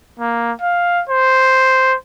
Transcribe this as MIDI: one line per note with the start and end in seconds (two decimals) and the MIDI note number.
0.20 0.52 58
0.62 1.03 77
1.09 1.96 72